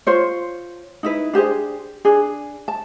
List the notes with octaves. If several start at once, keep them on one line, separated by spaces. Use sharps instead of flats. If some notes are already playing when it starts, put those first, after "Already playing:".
F4 C5 C#5
D#4 E4 B4
D4 G4 G#4 C5
D4 G#4
A5